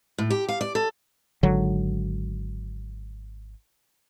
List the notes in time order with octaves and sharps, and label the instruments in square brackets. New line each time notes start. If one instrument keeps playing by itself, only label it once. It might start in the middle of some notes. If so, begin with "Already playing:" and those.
[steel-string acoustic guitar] A2
G4
F5
D5
A4
[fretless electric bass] G#1 D3 F#3